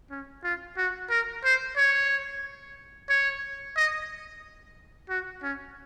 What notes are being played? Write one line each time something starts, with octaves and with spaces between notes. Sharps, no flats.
C#4
F4
F#4
A#4
C5
C#5
C#5
D#5
F#4
C#4